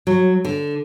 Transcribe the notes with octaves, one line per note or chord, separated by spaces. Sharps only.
F#3
D3